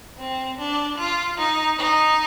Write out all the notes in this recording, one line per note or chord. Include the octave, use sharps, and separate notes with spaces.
C4
D4
F4
D#4
D#4